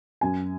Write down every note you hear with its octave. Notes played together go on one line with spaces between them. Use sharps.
F#2 G#5